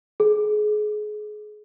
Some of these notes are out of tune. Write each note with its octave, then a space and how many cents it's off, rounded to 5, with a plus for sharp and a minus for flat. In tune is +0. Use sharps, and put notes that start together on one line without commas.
G#4 +30